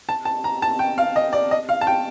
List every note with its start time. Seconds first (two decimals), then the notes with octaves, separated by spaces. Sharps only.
0.09 A5
0.25 A5
0.44 A#5
0.62 A5
0.79 G5
0.98 F5
1.16 D#5
1.33 D5
1.51 D#5
1.69 F5
1.81 A5
1.87 G5